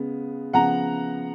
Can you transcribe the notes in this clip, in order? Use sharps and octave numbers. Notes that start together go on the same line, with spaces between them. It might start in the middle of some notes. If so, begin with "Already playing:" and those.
Already playing: C#3 G#3 B3
C#3 F3 B3 F#5 A#5